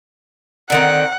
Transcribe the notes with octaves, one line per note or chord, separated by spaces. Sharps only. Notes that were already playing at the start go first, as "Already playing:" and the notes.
D3 D#3 C4 F#5